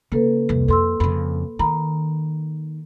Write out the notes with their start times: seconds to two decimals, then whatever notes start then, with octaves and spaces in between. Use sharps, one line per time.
0.12 C#3 A#3 A4 B4
0.49 C2 F2
0.68 F2 A4 C6 E6
1.00 F2 C#3 B5
1.59 D#3 A#5 B5